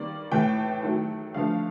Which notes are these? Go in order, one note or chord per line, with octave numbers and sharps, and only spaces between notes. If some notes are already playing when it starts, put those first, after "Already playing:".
Already playing: D#3 G3 A#3 D5
A2 E3 A3 G5
D#3 F#3 A3
D3 F3 A3 F5